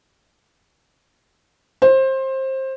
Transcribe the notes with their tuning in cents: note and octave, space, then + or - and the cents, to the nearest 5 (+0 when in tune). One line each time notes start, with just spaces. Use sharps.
C5 +20